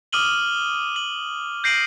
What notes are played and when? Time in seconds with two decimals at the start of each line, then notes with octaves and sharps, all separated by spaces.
0.12 D6 D#6 F6 D#7 F#7 G7
0.96 F#7
1.64 G6 A#6 C7 D7 D#7 F#7